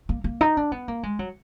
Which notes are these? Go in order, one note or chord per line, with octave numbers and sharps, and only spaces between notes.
A#3
A#3
D#4
D4
B3
A#3
G#3
F#3